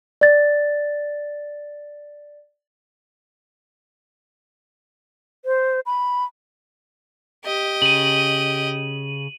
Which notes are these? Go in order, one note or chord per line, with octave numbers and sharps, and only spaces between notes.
D5 A6
C5
B5
G4 D#5
C#3 D#7 F#7